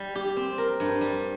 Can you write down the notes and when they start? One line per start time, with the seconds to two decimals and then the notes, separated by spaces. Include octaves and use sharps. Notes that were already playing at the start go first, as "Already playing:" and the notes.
Already playing: G3
0.15 G4
0.36 C4
0.58 A#4
0.80 G2
1.01 G3